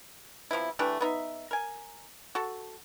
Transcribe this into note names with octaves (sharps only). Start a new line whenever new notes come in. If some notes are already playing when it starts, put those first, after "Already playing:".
C3 F3 B3 E4
E3 A3 D4 G4
B3 D#4 E5
A#4 G#5
F#4 A4